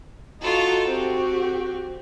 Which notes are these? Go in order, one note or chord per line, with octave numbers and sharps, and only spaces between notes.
D#4 F4 F#4 A4
C4 F#4 G4